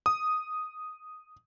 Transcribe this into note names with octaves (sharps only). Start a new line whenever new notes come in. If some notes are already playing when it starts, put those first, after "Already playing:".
D#6